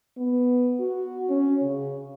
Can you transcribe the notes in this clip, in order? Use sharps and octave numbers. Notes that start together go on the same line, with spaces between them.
B3
F#4
C#4
C#3